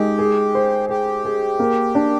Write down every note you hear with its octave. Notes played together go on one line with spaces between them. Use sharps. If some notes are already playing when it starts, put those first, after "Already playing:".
Already playing: G#3 D#4 G4
G#4
C5
G4 G#4
G#4
A#3
D4